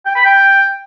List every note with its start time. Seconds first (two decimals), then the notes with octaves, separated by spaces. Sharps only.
0.06 G5
0.15 B5
0.25 G5